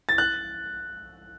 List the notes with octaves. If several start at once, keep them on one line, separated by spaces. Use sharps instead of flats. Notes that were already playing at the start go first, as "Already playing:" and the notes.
A6
F#6